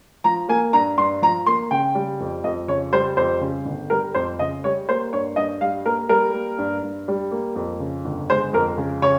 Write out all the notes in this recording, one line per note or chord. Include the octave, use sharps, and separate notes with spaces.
F3 A#5
A#3 G#5
G2 A#5
G2 C6
F3 A#5
A#3 C6
C#3 G5
G3
F2
F2 D#5
C#3 C#5
G3 C5
F2 C5
C#3
G1
G3 A#4
F2 C5
C#3 D#5
G3 C#5
A#3 C5
G2 C#5
G2 D#5
G3 F5
A#3 A#4
G3 A#4
A#3
G2
G2
G3
A#3
F2
C#3
G1
G#3 C5
F2 A#4
C#3
C#3 C#5